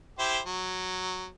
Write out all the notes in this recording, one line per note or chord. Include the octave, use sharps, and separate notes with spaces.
E4 G4 C5
F#3